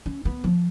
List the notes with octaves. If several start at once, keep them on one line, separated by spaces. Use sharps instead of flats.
C#4
B3
F3